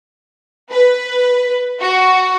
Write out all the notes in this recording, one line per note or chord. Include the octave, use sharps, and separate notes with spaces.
B4
F#4